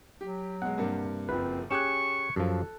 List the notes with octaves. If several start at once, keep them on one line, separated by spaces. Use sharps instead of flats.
F#3 G4
B2 G#3 F#5
G2 C3 A#3
F#1 F3 C4 B4
C#4 G4 G#4 C#6 F#6 G#6 E7
F#2 F3 G4 A4